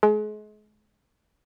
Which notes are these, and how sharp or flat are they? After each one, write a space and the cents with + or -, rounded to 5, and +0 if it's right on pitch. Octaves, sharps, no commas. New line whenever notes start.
G#3 +35